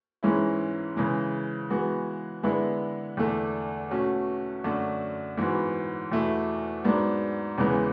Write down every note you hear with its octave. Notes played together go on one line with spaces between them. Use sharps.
G#2 E3 G#3 C#4 E4
C#3 E3 G#3
E3 G#3 B3 F#4
D3 G#3 B3 E4 B4
E2 D3 A3 D4 A4
B2 A3 C#4 F#4
F#2 D3 A3 D4 F#4
G#2 E3 B3 F#4
E2 B2 A3 E4
G#2 F#3 B3 D4
E2 C#3 E3 G#3 B3